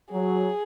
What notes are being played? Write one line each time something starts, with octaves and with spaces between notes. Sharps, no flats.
F#3 G#4